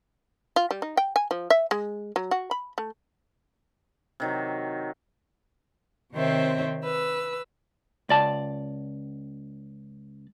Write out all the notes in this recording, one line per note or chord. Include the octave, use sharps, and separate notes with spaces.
F4
G3
D#4
G5
G#5
F3
E5
G#3
F#3
F#4
B5
A3
C3 D#3 F#3
C3 D#3 C4 C5 C#5 E5
B4 E6
C#2 D5 A5